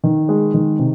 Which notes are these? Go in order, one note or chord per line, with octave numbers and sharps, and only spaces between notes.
D#3
G#3
D#3
C3